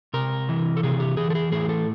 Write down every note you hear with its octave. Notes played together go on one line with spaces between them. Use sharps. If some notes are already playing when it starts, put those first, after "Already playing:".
C3 A#4
E3
A4
C3 G#4
G4
E3 G#4
A4
G#4
A2 G#4
A4